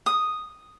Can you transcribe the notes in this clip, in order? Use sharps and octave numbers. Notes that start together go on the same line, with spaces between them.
D#6